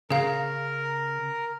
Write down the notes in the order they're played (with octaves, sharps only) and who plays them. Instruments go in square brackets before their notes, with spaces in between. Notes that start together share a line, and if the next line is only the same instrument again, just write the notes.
[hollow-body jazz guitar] C#3 [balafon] G#4 F5 [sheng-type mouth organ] A#4